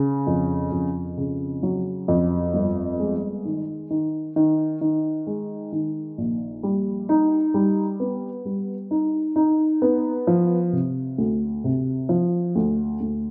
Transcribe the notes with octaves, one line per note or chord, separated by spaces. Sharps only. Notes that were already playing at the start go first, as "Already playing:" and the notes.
Already playing: C#3
F2
F2
C#3
F#3
F2
G1
G#3
D#3
D#3
D#3
D#3
G#3
D#3
A#1
G3
D#4
G3
B3
G3
D#4
D#4
B3
F3
C3
D2
C3
F3
D2
D2